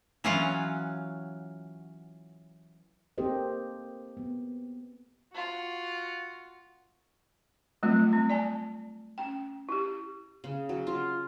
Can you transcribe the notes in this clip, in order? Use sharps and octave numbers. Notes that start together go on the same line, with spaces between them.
E3 F#3 C#4 F4 F5 F#5
A#3 C4 G4 A4 C5 D#5
B3
F4 F#4
F#3 G3 A3 C4 F4
C4
D5 G#5 A5
C#4 G5
E4 G4
C#3
F#3
F4